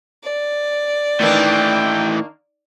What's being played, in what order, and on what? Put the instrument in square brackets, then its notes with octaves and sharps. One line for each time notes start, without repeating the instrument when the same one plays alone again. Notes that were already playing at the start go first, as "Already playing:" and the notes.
[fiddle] D5
[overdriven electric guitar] A2 E3 [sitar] D#3 A#3 D4 [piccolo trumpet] G5